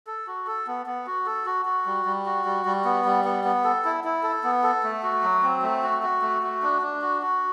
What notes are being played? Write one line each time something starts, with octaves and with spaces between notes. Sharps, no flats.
A4
F#4
A4
B3
B3
F#4
A4
F#4
F#4
G3
G3
F#4
G3
G3
B3
G3
B3
B3
A4
E4
E4
A4
B3
A4
A3
F#4
F#3
C4
A3
F#4
F#4
A3
F#4
D4
D4
F#4
F#4